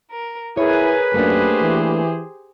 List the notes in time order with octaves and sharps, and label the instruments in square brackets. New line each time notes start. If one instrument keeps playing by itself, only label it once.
[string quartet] A#4
[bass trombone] E4 [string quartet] G#4 A#4 G#5 [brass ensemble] B4 [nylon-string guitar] C#5
[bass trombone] F#2 [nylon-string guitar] A3 A#3 D4 [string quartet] G4 G#4 C5
[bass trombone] E3